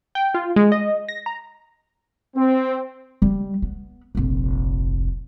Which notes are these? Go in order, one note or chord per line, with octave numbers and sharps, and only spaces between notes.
G5
F4
G#3
D#5
A#6
A#5
C4
G3 G#3
B3
F1 A#1